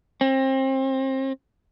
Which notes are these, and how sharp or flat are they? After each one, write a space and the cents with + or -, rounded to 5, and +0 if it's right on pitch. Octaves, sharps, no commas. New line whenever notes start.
C4 +30